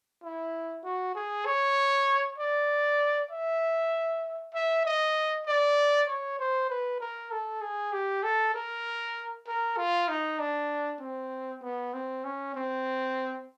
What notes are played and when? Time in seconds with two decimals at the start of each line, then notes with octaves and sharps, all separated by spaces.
0.23 E4
0.84 F#4
1.15 G#4
1.46 C#5
2.38 D5
3.31 E5
4.54 E5
4.85 D#5
5.46 D5
6.08 C#5
6.39 C5
6.70 B4
7.00 A#4
7.31 A4
7.62 G#4
7.93 G4
8.23 A4
8.54 A#4
9.47 A#4
9.77 F4
10.09 D#4
10.39 D4
11.01 C4
11.62 B3
11.93 C4
12.24 C#4
12.55 C4